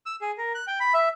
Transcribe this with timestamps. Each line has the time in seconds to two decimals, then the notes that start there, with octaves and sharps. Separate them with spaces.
0.06 E6
0.21 G#4
0.38 A#4
0.55 F#6
0.67 G5
0.80 B5
0.94 E5